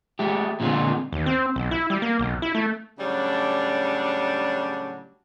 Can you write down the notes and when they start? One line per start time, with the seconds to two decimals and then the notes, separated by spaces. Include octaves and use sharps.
0.19 G#3 A3 G4
0.60 A#2 D3 G#3 B3 C4 F4
1.13 D#2
1.26 C4
1.56 B1
1.71 E4
1.90 G3
2.02 A#3
2.19 B1
2.42 E4
2.55 A3
2.99 A2 C#3 F#3 G3 D4